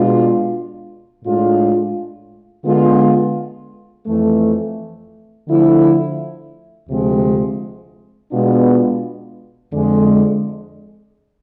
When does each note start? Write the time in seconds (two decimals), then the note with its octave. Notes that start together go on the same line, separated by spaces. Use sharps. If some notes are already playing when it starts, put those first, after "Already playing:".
Already playing: B2 G#3 D4 F4
1.23 A2 G#3 D4 F4
2.64 D3 G#3 B3 F4
4.06 F2 E3 A3
5.48 D3 F3 A3 E4
6.89 D2 C3 F3 G#3 C4
8.30 B2 G#3 B3 D4 F4
9.70 F2 D3 G#3